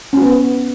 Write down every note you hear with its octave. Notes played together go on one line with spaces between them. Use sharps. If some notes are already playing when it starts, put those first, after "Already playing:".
B3 C#4 F#4